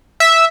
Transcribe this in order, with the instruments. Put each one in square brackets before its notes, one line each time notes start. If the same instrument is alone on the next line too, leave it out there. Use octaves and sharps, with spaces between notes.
[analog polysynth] E5